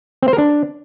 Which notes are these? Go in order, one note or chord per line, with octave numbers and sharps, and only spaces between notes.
C4
C5
A#4
D4